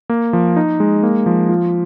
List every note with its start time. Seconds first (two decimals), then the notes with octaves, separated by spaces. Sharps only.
0.09 A#3
0.33 F3
0.56 D#4
0.80 G#3
1.03 A#3
1.26 F3
1.49 F4